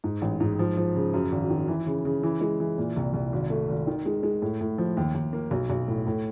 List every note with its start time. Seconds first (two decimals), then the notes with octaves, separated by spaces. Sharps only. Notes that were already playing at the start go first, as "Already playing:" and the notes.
0.04 G#2
0.22 A1
0.40 G#2
0.59 F3
0.77 F3
0.96 C#3
1.14 F#2
1.32 G#1
1.50 D#3
1.68 E3
1.86 C#3
2.05 C#3
2.23 E3
2.41 G#3
2.60 E3
2.78 A#2
2.96 C2
3.14 C2
3.33 G#1
3.50 A3
3.69 G#1
3.87 D#3
4.06 G#3
4.23 G#3
4.42 A2
4.61 A2
4.78 F3
4.97 D#2
5.14 D#2
5.33 A#3
5.51 B1
5.70 B1
5.88 A2
6.07 A2